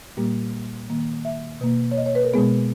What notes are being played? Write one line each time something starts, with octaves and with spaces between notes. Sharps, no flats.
A#2 G3 A#3 G4
D#3 A#3
E5
B2 A#3
C#5
D#5
C#5
B4
A#4
B2 G#3 B3 G#4